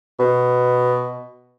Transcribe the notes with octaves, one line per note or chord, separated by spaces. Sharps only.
B2